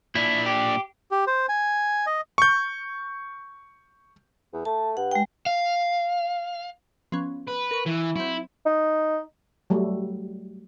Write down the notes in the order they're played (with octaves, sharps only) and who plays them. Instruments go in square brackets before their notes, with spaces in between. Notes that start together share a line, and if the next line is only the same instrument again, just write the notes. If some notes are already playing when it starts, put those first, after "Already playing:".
[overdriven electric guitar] A#2 D4 [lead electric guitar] E4
[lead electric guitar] G4
[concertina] G4
C5
G#5
D#5
[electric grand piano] C#6 G6
[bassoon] E2
[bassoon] A3 [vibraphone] A5
[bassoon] G2 [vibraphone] F#5
[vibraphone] G#3 G5
[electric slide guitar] F5
[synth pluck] F3 B3 C#4
[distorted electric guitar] B4
[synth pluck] A#4 C#6
[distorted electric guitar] E3
[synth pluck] F#3 C4 [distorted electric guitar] E4
[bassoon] D#4
[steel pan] F#3 G3 A3